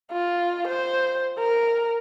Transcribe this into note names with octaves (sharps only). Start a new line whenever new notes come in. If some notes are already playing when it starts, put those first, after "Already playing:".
F4
C5
A#4